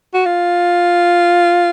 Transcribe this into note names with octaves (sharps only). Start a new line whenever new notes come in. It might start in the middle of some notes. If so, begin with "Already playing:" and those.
F#4
F4